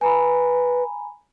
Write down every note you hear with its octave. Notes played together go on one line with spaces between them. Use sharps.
B4 G#5 A#5 B5